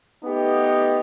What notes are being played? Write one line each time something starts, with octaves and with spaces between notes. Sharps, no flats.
A3 B3 D#4 G4